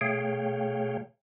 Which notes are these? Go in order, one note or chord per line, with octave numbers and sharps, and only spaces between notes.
B2 A3 G#4 C#5 F5 G5